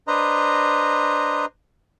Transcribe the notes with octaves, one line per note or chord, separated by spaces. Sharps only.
D4 B4 C5 D#5 A#5